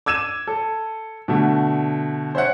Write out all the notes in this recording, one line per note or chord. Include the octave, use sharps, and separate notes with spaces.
D6 E6 G#6 D#7 E7
A4
B2 D3 A3
C5 C#5 E5 F#5